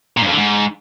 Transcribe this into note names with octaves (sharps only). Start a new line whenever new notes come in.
A#2
G2
F2
D3
G#2